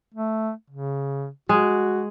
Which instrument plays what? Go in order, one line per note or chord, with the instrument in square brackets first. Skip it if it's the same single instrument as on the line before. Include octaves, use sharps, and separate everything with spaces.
[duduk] A3
C#3
[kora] G#3 [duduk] F#4